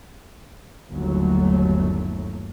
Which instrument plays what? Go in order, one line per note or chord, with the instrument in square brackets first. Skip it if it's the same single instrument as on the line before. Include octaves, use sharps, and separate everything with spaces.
[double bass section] G1 D#2 F#3 A3